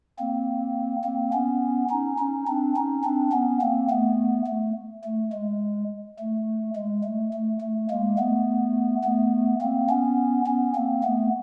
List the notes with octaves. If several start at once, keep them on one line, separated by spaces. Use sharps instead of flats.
A#3 C4
A#3 C4
B3 C#4
C#4 D#4
C#4 D#4
C4 D4
C#4 D#4
C4 D4
B3 C#4
A#3 C4
A3 B3
A3
A3
G#3
A3
G#3
A3
A3
A3
G#3 A#3
A3 B3
A3 B3
A#3 C4
B3 C#4
B3 C#4
A#3 C4
A3 B3